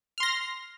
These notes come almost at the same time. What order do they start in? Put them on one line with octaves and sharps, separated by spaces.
F6 C6 A#6